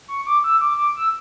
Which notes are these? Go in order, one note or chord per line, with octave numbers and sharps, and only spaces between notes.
C#6
D6
E6
D6
D6
E6